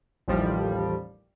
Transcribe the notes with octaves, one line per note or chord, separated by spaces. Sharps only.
A1 D#2 F3 G3